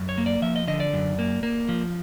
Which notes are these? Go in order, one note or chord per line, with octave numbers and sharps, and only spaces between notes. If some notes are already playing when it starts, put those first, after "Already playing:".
Already playing: F#2
C#5
A#3
D5
F3 E5
D#5
D3 D#5
D5
F#2
A#3
A#3
F3